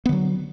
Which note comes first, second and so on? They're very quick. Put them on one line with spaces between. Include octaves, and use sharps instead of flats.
B3 D3 F#3